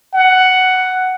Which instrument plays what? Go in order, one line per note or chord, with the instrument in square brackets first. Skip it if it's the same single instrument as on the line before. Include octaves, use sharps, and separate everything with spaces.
[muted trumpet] F#5